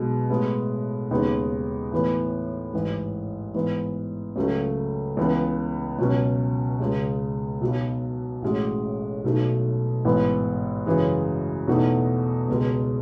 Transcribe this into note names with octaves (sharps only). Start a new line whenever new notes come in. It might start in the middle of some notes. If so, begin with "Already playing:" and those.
Already playing: B1 B2 G#3
A2 G#3 B3
D#2 C#3 G#3 B3 D#4
A2 E3 B3 E4
A1 G#2 E3
G#2 E3 B3
C#2 C#3 F#3 A3
C#2 C#3 E3 B3
C#2 B2 F#3 C#4
C#2 C#3 G#3
B1 B2 F#3 B3
A1 A2 G#3 C#4 F#4
B1 B2 A3 D#4
A1 G#2 E3 B3
F#2 C#3 E3 G#3
E2 B2 A3 D#4 F#4
C#2 B2 G#3